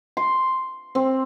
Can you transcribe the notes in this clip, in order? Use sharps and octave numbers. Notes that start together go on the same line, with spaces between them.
C6
C4